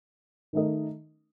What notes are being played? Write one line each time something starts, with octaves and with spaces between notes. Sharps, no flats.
D#3 A3 D#4 A#4 D#5